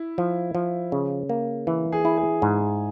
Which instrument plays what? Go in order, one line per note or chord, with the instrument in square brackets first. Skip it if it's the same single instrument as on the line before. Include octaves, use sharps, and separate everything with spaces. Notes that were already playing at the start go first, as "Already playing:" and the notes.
Already playing: [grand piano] E4
[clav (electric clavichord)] F3
F3
C#3
A#3
E3
[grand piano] G#4
[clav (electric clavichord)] E4
[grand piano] G#4
[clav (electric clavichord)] G#2